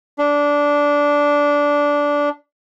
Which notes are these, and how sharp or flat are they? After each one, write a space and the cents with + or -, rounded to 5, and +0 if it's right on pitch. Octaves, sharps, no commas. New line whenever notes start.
D4 -15